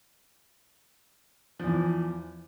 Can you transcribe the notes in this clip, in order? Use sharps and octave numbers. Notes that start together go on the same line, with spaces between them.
E2 E3 F3